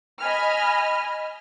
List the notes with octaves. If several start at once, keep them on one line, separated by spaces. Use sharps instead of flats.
D#5 G#5 B5 F6